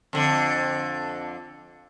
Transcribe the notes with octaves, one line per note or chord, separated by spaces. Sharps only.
F2 D3